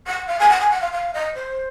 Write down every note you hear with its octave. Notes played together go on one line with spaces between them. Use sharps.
F#5
F5
G#5
F#5
G#5
F#5
F5
F5
D#5
C5